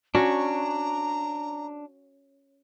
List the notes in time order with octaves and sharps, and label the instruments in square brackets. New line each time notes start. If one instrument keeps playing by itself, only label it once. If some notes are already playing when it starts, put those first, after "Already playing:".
[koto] C#4 [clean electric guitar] D4 [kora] F#4 [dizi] A#5